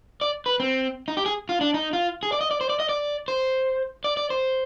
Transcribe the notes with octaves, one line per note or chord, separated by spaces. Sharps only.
D5
B4
C4
D#4
G4
G#4
F4
D4
D#4
F4
G#4
D5
D#5
D5
C5
D5
D#5
D5
C5
D5
D5
C5